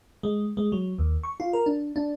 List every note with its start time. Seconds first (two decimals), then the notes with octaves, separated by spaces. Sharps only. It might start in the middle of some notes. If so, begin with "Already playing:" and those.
0.23 G#3
0.57 G#3
0.72 F#3
0.98 D#2
1.23 C#6
1.40 F4
1.53 A#4
1.66 D4
1.96 D4